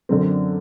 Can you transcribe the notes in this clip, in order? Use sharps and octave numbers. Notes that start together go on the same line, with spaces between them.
F#2 D3 F#3 C4